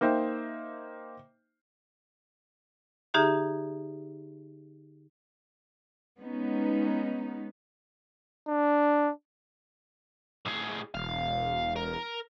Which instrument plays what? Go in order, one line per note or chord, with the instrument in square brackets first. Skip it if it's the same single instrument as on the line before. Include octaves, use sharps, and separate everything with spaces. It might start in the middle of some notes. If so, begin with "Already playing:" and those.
[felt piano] A#3 D#4 C5 E5 G5
[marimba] D3 D#4 G4 G#4 E5 A#5
[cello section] G#3 B3 C#4 D#4
[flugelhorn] D4
[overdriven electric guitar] A2 G#4
[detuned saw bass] E1 [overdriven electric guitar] F5
[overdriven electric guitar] A#4